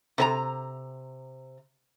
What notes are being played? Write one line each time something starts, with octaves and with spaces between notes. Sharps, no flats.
C3 B4 A#5